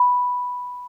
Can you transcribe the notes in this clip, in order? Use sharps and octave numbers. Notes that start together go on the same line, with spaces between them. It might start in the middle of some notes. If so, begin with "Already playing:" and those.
Already playing: B5